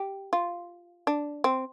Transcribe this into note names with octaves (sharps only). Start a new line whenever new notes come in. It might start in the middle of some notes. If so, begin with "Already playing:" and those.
Already playing: G4
F4
D4
C4